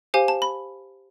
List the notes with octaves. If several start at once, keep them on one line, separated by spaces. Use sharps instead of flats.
G4 C5 F5 G#5
A5
B5